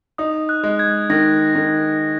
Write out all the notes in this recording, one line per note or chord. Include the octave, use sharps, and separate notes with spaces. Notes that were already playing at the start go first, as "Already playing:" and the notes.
D#4 D#6
F#6
G#3
G#6
D#3 A#6
D#3